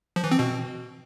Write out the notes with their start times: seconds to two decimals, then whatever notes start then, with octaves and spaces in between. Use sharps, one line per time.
0.16 F3
0.24 E3
0.31 C4
0.39 B2